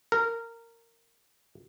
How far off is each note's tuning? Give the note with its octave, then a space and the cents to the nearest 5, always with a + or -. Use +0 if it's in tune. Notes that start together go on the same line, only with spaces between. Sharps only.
A#4 -15